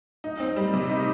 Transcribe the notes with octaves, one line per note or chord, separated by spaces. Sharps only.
D#4
C4
G3
C3
D#4